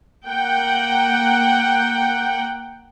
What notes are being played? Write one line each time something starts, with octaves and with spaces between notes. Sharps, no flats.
A#3 F#5 G5